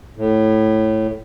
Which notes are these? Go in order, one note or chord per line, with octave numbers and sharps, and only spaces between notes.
A2